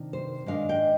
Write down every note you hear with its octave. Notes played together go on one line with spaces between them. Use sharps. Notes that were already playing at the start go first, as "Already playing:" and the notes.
Already playing: C3 D#3 D4
C5
G#2 D#3 G#3 D4 F5
G5